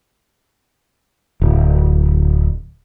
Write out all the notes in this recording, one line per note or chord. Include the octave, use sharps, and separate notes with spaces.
D1